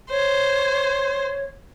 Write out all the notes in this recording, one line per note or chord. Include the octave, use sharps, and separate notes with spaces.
C5 C#5